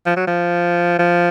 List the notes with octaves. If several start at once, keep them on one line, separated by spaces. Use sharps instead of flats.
F3
F#3
F3
F3